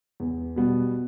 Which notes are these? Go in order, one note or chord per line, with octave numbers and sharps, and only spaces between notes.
E2
B2 G3 B3